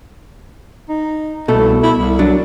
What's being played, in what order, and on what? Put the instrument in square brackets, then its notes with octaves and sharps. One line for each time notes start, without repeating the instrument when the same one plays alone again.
[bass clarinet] D#4
[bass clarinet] C2 [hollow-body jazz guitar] B2 A3 A4
[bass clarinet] E4
C2
[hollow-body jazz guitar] F#3 D4